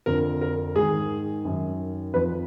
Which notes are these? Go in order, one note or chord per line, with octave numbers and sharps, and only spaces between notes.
F2 D3 F3 A#4
A#4
G#2 D#3 G#4
F#2 D#3
F2 F3 B4